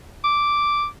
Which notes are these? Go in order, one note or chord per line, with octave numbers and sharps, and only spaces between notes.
D6